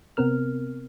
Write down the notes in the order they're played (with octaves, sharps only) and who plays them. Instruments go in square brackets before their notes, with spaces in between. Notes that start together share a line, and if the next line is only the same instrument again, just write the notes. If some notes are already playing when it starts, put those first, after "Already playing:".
[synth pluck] C3 B3 C4 A#4 F6